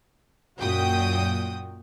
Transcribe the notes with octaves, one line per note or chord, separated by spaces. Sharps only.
F#2 A#2 F#4 G5 D#6